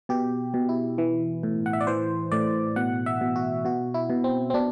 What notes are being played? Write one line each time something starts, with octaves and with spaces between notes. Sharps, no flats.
B2 G4
B2
E4
E3
A2
F#5
E5
D5
E3 C5
A2 D5
B2 F#5
E5
B2
F#4
B2 F#4
E4
B2
C4
C4
B2 D4